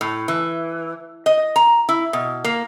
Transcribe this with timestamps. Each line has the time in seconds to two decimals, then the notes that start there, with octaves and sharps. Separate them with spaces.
0.01 A2
0.28 E3
1.26 D#5
1.56 A#5
1.89 E4
2.13 B2
2.44 A#3